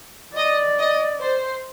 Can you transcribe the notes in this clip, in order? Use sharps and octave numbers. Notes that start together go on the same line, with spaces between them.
D5 D#5
D#5
C5